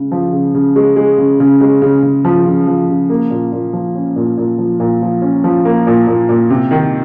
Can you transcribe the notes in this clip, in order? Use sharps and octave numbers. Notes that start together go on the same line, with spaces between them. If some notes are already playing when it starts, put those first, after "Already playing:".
Already playing: C#3 G#3
F3
C#3
C#3
G#3
G#3
C#3
C#3
G#3
C#3
C#3
F3
C#3
F3
C#3
A#3
A#2
A#2
F3
C#4
A#2
A#2
F3
A#2
F3
C#4
F3
A#3
A#2
A#2
A#2
C3
D#3